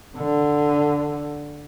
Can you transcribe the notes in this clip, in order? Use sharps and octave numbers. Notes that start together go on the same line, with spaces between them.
D3